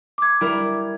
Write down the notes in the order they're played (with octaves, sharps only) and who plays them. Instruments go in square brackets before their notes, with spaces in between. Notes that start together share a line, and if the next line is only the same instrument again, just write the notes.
[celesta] D6 G#6
[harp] G3 E4 A#4